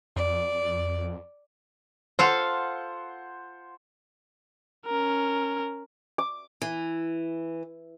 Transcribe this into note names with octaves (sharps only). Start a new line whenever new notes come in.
F2 D5
F4 A4 C5 F5 F#5 C6
C#4 A#4
D6
E3